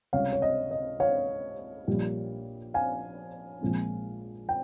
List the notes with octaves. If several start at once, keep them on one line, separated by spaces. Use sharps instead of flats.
C#2 C3 G3 C#5 F5
C#5
D#5
D#5
C#5 F5
A#1 A#2 G3
F5 G#5
A#1 A#2 G#3 C4
G5